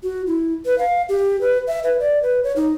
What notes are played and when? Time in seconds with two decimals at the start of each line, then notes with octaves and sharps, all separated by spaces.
0.03 F#4
0.27 E4
0.65 B4
0.78 F5
1.09 G4
1.41 B4
1.67 E5
1.84 B4
2.00 D5
2.22 B4
2.44 C#5
2.56 D#4